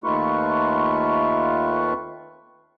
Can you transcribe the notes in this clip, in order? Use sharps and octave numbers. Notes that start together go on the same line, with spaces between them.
D#2 D#3 A3 F4 B4 C#6